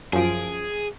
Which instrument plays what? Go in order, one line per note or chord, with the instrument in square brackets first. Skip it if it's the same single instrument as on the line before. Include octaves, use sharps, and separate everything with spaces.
[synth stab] F#2 F3 D7 [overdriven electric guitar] G#4